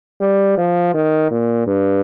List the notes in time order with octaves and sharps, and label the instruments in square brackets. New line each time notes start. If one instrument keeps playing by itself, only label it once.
[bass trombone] G3
F3
D#3
A#2
G2